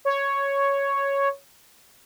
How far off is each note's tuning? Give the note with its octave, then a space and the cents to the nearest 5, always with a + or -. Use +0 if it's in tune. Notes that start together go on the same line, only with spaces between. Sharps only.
C#5 +0